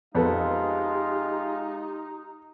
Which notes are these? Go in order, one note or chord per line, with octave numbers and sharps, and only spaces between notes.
F2 G#3 B3 D#4 F4 G4 A4 F5